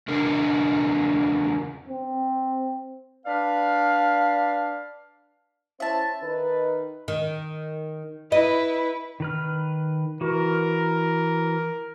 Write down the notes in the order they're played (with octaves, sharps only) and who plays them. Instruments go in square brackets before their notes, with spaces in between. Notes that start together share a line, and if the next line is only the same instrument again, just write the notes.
[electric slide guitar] E2 C#3 D4 A#4
[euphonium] C4
[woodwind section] D4 B4 D5 F5
[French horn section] C#4 E4 C5 [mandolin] E5 A5
[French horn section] D#3 D#4 B4
[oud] D#3
[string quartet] E4 B4 [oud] D#5
[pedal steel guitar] D#3 B4 F6
[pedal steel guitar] E3 F#4 [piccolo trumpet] A#4